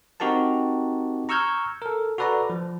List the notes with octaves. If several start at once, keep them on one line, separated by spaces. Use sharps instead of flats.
C4 D#4 F#4 G4 A#4 A5
A#5 C#6 E6 F6 G6 G#6
A4 A#4
F#4 A4 B4 D5 A#5
F3